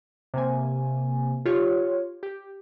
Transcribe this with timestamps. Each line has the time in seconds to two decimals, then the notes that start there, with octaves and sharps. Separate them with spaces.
0.34 C3 A#3 G#5
1.45 F4 G4 C#5
2.23 G4